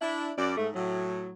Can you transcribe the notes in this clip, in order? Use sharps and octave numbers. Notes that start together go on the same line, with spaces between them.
D4 E4
F#2 D5
G#2 A3
A2 F#3